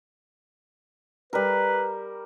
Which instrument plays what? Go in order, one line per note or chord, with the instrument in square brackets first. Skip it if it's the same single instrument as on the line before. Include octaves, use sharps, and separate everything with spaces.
[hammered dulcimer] G3 A#4 [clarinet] B4